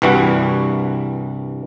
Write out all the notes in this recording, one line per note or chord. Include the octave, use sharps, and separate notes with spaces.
C2 G2 E3 G3 F#4